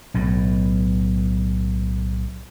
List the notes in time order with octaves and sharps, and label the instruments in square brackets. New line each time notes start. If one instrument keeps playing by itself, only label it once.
[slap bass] B1 A2